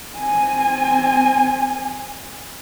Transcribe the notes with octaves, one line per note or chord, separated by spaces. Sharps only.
C4 G#5